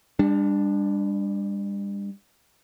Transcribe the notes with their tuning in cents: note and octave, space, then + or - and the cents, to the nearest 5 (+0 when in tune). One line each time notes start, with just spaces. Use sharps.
G3 +40 D4 +0